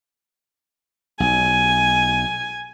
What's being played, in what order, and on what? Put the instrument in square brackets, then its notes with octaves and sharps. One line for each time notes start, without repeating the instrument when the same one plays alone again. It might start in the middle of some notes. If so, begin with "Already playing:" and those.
[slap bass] B1 [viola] G#5